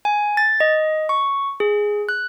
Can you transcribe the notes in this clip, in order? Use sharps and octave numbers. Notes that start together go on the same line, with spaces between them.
G#5
A6
D#5
C#6
G#4
F#6